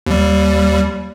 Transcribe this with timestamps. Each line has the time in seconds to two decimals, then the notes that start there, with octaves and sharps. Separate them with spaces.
0.06 D#2 G3